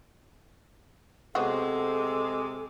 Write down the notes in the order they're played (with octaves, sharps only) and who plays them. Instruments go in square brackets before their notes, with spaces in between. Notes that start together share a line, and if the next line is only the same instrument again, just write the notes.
[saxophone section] C3 G#3 [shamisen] B3 C4 F#4 [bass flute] A4